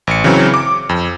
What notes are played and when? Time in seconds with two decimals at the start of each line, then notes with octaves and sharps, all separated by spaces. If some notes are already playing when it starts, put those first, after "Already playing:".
0.07 A1 C#7
0.24 C#3 E3 F#3 C4
0.54 D6
0.89 F2